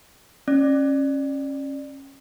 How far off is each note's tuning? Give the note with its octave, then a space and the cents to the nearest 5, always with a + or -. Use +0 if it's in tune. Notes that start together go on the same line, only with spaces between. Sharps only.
C#4 -20 D5 +20